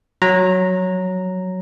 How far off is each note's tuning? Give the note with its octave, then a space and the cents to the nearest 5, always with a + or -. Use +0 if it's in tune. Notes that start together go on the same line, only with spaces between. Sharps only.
F#3 +0 A#5 -5